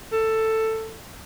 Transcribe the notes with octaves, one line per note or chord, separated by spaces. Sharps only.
A4